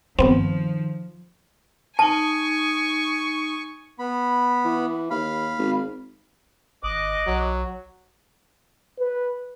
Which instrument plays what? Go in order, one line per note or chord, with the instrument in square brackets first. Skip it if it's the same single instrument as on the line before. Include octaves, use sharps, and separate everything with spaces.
[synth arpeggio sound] G2 B3 C4 [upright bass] D#3 [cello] F3
[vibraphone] D#4 D#6 [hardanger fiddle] G#5 C#6 [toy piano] A5
[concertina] B3 B5
[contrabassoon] E3
[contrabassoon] D#2 [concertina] F5 B5
[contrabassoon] G#1
[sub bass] G#1 [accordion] D#5 D6 F#6
[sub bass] B1 [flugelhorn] F#3
[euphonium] B4